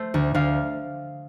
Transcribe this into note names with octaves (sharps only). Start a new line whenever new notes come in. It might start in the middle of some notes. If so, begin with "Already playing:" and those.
Already playing: A3 C5
D2
D2 F5